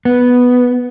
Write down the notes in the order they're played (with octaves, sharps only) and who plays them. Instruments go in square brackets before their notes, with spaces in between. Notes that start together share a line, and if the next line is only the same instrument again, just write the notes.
[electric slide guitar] B3